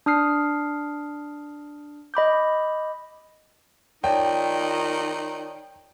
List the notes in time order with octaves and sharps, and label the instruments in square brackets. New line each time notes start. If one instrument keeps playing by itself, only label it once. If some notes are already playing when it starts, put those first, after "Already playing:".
[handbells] D4 D#6 F6 C7
D#5 B5 D6 G6
[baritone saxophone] D#3 [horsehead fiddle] D#4 F4 [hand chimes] C#5 D5 A5 [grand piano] G5